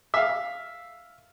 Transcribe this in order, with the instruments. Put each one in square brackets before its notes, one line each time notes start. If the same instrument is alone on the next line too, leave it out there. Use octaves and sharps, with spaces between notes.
[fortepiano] E5 F5